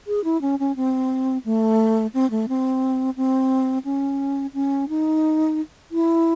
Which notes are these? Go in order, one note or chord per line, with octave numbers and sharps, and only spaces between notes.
G#4
E4
C#4
C#4
C4
A3
C4
A3
C4
C4
C#4
C#4
D#4
E4